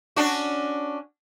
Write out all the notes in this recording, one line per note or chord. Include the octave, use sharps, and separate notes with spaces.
C#4 D4 F#4